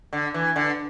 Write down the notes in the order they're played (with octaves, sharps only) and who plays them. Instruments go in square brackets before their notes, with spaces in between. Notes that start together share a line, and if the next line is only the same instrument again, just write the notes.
[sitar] D3
E3
D3